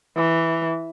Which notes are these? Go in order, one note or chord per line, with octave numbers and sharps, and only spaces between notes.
E3